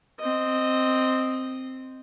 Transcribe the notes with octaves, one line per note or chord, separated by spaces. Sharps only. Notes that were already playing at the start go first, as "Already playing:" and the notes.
C4 D#5